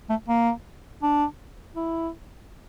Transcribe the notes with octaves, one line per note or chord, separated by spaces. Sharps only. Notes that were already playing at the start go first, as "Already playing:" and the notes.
A3
A#3
D4
E4